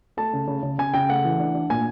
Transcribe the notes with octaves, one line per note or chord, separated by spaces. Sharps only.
A3 A5
C#3
C#3
C#3
C#3 G#5
C#3 G5
A3 F#5
E3
D4
D4
A#2 G#5